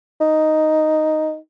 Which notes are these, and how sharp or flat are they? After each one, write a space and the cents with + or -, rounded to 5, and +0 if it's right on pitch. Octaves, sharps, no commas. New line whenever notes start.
D#4 +0